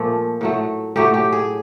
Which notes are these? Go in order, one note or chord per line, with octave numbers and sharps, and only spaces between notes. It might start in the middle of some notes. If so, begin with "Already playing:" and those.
Already playing: A#2 F3 A3
A2 F#3 A3
A2 F#3 A3 G4
G4
G#4